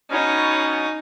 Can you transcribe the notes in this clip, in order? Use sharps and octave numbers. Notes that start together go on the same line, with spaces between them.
B2 C#4 D#4